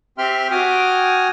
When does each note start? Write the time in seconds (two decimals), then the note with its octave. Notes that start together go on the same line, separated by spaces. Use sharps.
0.18 C4 G4 E5 G5 C6 F6
0.51 F#4 G5 G#5 D6 D#6 F6